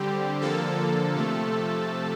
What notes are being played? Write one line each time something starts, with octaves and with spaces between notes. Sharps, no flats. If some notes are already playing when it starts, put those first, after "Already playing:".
Already playing: D3 G3 C4 G4
D3 F3 A#3 A4
C3 F3 A3